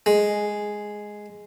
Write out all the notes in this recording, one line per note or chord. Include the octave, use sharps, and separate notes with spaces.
G#3